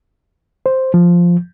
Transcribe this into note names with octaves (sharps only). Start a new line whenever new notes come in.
C5
F3